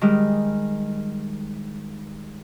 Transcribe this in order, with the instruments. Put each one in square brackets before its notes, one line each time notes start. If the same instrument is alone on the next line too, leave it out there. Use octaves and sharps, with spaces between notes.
[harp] D#3 G3 G#3